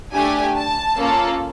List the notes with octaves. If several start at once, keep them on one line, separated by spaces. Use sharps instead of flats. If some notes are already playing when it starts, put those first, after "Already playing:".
A3 D4 G4 G#5
A5
A#3 C#4 F4 A4